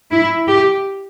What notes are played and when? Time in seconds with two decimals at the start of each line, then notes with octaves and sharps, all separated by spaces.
0.11 E4
0.48 G4